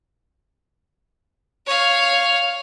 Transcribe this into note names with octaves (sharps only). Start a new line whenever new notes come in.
C#5 F5